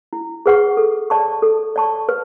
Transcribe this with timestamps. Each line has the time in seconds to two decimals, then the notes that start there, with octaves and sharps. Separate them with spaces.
0.13 E4
0.46 G#4 B4 F#5 C#6
0.77 A4
1.10 D5 A5 C#6
1.42 A4
1.76 D5 A5 C#6
2.09 B4